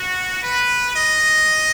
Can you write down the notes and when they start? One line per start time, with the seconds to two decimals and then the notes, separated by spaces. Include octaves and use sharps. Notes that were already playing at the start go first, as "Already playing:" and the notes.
Already playing: F#4
0.43 B4
0.94 D#5